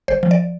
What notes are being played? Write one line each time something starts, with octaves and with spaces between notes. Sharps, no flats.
G1 C5
F3
D5